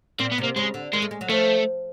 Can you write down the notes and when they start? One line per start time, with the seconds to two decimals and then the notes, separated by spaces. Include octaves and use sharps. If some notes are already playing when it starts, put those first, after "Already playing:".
0.19 A#2 C4
0.31 B3
0.38 C3
0.43 A#3
0.56 C#3 G#3
0.74 D3
0.93 D#3 G#3
1.02 A3
1.11 G#3
1.21 F#3
1.29 F3 A3